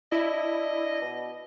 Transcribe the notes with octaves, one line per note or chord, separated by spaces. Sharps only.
D4 E4 D#5
B2